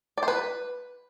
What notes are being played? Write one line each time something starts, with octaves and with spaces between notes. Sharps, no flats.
D5
C5
B4